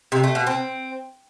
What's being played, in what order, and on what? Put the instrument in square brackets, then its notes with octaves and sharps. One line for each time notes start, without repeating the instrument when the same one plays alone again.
[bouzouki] C3
A3
B2
C4